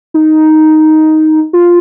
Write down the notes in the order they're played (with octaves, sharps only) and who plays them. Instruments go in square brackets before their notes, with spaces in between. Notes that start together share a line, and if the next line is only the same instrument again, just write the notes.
[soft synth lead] D#4
F4